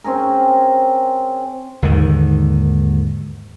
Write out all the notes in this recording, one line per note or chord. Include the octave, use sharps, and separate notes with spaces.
C4 C#4 G#4 A#4
D#2 G#2 D3 D#3